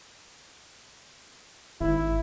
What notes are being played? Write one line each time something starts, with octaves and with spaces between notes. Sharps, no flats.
G#1 E4